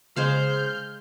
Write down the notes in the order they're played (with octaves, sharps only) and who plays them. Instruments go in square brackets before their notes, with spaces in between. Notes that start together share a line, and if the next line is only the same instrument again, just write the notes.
[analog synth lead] C#3 [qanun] G#3 C5 F5 [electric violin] F6 G6